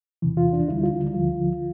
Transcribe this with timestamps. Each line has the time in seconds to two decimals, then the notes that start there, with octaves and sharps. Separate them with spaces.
0.22 E2 C3 E3
0.37 F4
0.53 D4
0.68 D2 D3 G3 E4
0.84 F4
1.14 D2 D3 F3 F4